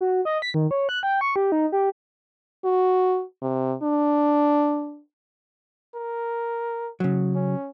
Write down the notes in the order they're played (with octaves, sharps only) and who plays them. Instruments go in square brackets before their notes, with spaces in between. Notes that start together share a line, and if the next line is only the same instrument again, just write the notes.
[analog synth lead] F#4
D#5
B6
D#3
C#5
F#6
G5
C#6
G4
D#4
G4
[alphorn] F#4
C3
D4
[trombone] A#4
[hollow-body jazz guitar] C#3 F#3
[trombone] C#4